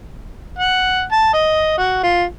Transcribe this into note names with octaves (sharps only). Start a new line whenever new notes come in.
F#5
A5
D#5
F#4
F4